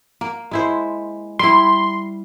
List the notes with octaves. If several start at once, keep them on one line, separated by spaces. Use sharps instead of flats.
A#3
G#3 E4 C5
G3 E4 C6